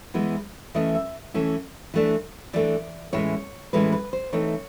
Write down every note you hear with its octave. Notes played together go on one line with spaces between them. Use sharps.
E3 G#3 B3 E4
E3 A3 C#4 E4 D#5
E5
E3 A3 C#4 E4
E3 A3 D4
E3 A3 D4 D5
A2 E3 G#3 C#4 E4 C#5
A2 E3 G#3 C#4 E4 B4
B4
C5
E3 A3 C4 D#4 C#5